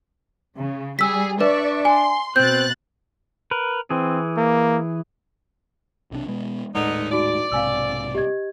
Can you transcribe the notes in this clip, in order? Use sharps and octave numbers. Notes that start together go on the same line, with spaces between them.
C#3
G3 G#4 E6 B6
D4 B4 D5 E5 C#6
G#5 C6
B2 C4 F#6 G6 A6
A#4 B4
E3 C4 G#4
A#3
B1 C3 D4
B2 G#3 B3
D#1 A2 D3 G#3 B3 D#4
D#4 F#4 D5 D7
B1 G#2 C3 F5 G#5 E6
G4 D#5 G#6